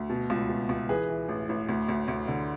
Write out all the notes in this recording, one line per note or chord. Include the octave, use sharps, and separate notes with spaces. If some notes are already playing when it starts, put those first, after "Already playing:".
Already playing: D2
B2
C#2
B2
C#2
E3 G#4 B4
E3
A1
A1
D2
D2
D2
D3